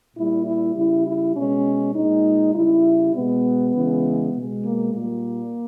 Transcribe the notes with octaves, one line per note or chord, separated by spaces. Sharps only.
A#2 G3 E4
E4
C#3 G3 E4
E4
B2 G#3 C#4
A#2 G#3 D#4
C#3 G3 E4
B2 G#3 B3
C#3 E3 G#3
B2
G#3
A#3
A#2 G3 A#3